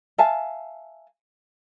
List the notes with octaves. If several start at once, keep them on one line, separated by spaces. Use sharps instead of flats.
E5 F5 G#5 A5